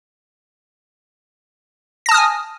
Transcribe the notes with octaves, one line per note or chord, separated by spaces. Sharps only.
G#5 A5 D#6 F6 A#6